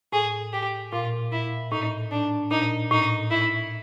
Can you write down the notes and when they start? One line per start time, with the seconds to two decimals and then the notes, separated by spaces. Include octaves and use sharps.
0.13 A2 G#4
0.53 G4
0.92 A#2 F4
1.32 E4
1.72 A2 D#4
2.12 D4
2.51 A#2 D#4
2.91 A2 D#4
3.31 E4